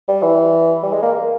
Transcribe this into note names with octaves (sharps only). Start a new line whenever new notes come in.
G3
E3
G3
G#3
A#3